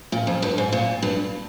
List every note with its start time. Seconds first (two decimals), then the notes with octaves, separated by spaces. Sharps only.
0.12 A#2
0.27 F2
0.42 G2
0.58 G#2
0.72 A#2
1.02 G2